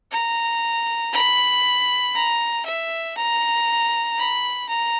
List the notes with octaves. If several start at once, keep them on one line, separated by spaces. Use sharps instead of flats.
A#5
B5
A#5
E5
A#5
B5
A#5